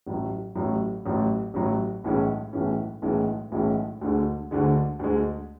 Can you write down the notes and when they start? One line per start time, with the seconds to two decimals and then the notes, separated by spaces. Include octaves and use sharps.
0.06 A1 A2 F#3
0.55 A1 A2 F#3
1.06 A1 A2 F#3
1.54 A1 A2 F#3
2.04 B1 A2 E3 G#3 C#4
2.53 B1 A2 E3 G#3 C#4
3.02 B1 A2 E3 G#3 C#4
3.52 B1 A2 E3 G#3 C#4
4.01 D2 D3 G#3
4.51 D2 D3 G#3
4.99 D2 D3 G#3